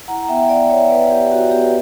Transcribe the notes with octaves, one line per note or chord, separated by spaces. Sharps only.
E4 F#5 A#5
A#5
B3 E5 G5
G5
B3 D5 F#5
B3 C#5 E5
B3 B4 D5
B3 G4
B3 F#4
B3 G4
B4